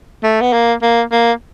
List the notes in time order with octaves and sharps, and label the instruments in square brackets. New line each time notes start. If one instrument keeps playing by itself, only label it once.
[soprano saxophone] A3
B3
A#3
A#3
A#3